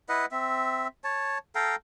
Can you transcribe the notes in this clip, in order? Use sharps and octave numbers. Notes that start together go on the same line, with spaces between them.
E4 B4 D#5 F#5
C4 E5
C#5 A5
A4 F5 G5 A#5